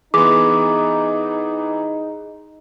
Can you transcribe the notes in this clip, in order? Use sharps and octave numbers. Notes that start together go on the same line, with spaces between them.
E3 B3 D#4 G#4 C6 D6